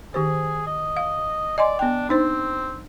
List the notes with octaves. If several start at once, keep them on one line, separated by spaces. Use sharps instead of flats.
D#3 G4 G#4 C5
D#5
F5
D5 D#5 G#5 C6
B3 D4 G5
C4 D4 D#4 C5